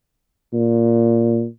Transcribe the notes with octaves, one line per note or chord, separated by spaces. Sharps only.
A#2